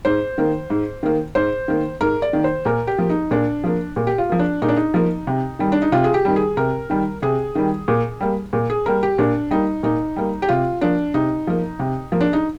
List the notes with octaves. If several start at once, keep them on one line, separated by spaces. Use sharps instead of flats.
G#2 C5
D#3 A#3
G#2
D#3 A#3
G#2 C5
D#3 A#3
G#2 A#4
D5
D#3 A#3
C5
A#2 A#4
G4
F3 A#3
D#4
A#2 D4
F3 A#3
A#2
G4
F4
F3 A#3
D4
A#2 D#4
D4
D#4
F3 A#3
C3
D#3 G3
D4
D#4
C3 F4
G#4
G4
D#3 G3
G#4
C3 A#4
D#3 G3
C3 G#4
D#3 G3
A#2
G3 A#3
A#2
G#4
G3 A#3 A#4
G4
A#2 D4
G3 A#3 D#4
A#2 D#4
G3 A#3
G4
C3 F4
F3 A#3 D4
C3 D#4
F3 A#3
C3
F3 A#3
D4
D#4